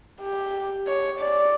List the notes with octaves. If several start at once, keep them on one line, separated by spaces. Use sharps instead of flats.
G4
C#5
D5